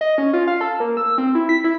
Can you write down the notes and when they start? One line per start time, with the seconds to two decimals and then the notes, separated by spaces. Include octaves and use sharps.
0.01 D#5
0.18 C#4
0.33 F4
0.47 F5
0.61 A4
0.80 A#3
0.97 E6
1.18 C4
1.35 E4
1.49 B6
1.64 E4